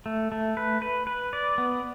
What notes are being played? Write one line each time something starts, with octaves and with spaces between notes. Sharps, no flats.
A3
A3
B4
B4
B4
D5
B3